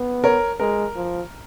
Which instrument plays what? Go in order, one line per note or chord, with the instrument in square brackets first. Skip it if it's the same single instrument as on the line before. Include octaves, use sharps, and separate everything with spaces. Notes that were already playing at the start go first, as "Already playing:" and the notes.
Already playing: [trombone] B3
[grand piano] A#4 C#5
[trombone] G#3 [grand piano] A#4
[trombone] F3